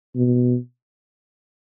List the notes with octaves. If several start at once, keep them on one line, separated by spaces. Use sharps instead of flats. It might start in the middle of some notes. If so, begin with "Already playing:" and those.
B2